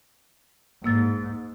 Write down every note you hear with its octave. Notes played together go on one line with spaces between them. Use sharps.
G#2 A#3 E6 A6